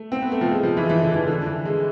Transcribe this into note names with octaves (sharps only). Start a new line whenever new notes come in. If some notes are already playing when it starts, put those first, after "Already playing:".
Already playing: A3
C4
B3
A3
F3
G#3
F3
E3
E3
D3
E3
D3
E3
G#3